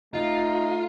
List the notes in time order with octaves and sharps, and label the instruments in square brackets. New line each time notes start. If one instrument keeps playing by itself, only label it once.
[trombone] A3 [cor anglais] D#4 [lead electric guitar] F4